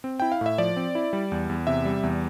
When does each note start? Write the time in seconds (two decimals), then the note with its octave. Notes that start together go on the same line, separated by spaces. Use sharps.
0.04 C4
0.20 E4 G5
0.32 F5
0.41 A2 E5
0.58 F3 D5
0.77 C4
0.95 E4
1.13 G3
1.32 E2
1.50 E2
1.67 C3 E5
1.85 G3
2.03 E2